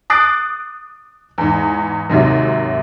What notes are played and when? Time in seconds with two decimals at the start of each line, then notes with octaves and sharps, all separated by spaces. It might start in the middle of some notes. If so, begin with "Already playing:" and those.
0.10 D6 D#6 F#6 A6 C7 D7
1.38 E2 G#2
2.10 D#2 G#2 C3 F#3